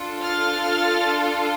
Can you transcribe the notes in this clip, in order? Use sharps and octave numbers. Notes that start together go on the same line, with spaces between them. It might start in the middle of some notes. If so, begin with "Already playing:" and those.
Already playing: D4 F4 A4
F6 A6